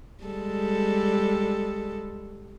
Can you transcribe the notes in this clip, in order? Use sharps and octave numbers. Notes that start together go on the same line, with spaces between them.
G3 G#3 A4